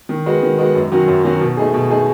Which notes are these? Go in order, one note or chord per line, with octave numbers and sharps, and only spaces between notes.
D#3
G#3 B3 F#4
D#3
G#3 B3 F#4
F#2
D#3 F#3 C#4 F#4
F#2
D#3 F#3 C#4 F#4
B2
A3 D#4 G#4
B2
A3 D#4 G#4